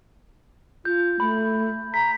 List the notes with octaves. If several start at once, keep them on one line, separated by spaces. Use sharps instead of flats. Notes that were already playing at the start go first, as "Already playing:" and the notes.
F4 G6
A3 B5
A#5 B6